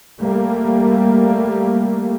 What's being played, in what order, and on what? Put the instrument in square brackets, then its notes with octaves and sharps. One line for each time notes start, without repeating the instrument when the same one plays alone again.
[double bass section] G3 A3 A#3